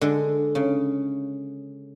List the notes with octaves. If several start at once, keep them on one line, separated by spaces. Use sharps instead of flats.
D3 G#3
C#3